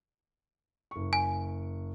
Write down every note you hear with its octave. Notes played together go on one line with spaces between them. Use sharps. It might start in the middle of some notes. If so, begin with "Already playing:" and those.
F#1 C#6
G#5